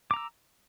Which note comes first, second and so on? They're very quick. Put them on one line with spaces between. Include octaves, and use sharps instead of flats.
D6 A#5 E6